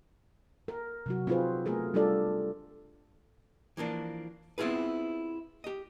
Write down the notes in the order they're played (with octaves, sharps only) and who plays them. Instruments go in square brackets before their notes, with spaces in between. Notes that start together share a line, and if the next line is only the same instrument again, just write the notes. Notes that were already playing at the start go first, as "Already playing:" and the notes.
[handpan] A#4
C3 F#3 F#4
C4 D#4 F4 G#4 B4 C5
A3 B3 G#4 A#4
G3 D4 F4 G4 A4 D5
[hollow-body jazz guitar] E3 F3 A#3 D4
B3 C4 E4 F4 G#4 B4
G4 D#5